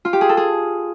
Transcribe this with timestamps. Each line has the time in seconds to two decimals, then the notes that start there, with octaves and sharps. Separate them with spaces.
0.05 F4
0.13 G4
0.21 G#4
0.29 A4
0.37 G#4